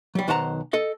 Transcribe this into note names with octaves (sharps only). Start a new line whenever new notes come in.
F#3 G3
B1 D#3 C5 F#5 A5 A#5
A4 D#5